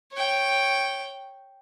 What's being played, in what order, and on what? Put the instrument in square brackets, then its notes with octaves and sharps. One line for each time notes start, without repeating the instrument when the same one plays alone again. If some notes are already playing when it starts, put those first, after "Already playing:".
[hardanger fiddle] C#5 G5